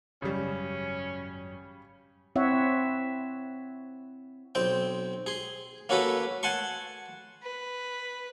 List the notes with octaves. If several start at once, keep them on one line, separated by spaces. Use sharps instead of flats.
G#1 F#2 C#3 G3 C#4
C4 E4 C#5 E5 F#5
B1 C4 G5
G#4 C6
A#3 C#4 F#4 A4 B4
F#5 G#5 A5 C6 C#6
B4